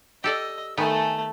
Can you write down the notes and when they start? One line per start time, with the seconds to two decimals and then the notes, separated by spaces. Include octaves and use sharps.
0.24 G4 A4 D5 D#5 E6
0.77 D#3 A3 B3 A4 G#5